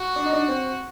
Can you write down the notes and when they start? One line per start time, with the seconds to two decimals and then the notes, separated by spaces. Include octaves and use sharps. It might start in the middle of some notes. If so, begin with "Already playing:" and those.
Already playing: F#4
0.16 D4
0.25 D#4
0.33 D4
0.48 C4